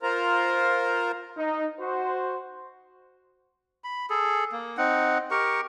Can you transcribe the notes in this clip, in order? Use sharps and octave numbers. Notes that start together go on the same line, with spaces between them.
F4 A#4 C5 A#5
D#4
F#4 C5
B5
G#4 A4
A#3
C4 D#4 F#5
G4 A#4 C#6